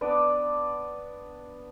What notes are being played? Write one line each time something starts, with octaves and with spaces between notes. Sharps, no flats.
B3 D4 D5 D6